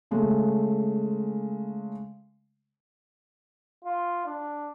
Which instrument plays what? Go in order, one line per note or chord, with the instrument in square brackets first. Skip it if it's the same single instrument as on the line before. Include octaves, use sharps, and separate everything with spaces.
[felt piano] C#3 G#3 A3
[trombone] F4
D4